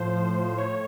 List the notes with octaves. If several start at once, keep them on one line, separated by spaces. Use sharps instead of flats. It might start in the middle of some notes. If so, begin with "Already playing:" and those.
Already playing: A2 F3 C5
F3
A2
A2 C#5